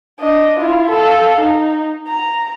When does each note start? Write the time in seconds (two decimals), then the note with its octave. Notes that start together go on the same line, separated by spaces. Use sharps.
0.20 D4 D#5
0.60 E4 F4
0.90 A4 F5
1.41 D#4
2.08 A#5